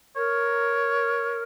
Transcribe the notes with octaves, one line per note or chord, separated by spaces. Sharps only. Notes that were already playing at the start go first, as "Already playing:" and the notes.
A#4 C#5